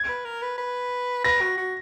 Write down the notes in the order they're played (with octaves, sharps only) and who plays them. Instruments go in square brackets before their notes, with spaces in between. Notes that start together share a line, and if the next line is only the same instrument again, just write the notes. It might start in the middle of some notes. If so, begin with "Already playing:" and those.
Already playing: [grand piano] G#6
[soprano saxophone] B4
A#4
B4
B4
[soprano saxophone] B4 [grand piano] A#6
[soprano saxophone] F#4
F#4